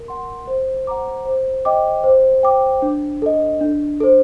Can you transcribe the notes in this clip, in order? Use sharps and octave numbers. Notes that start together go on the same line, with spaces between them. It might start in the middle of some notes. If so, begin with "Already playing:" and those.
Already playing: A#4
F#5 C6
C5
F#5 A#5 D6
C5
D#5 G5 D6
C5
G5 D6
D4
A4 D#5
D4
A4 C5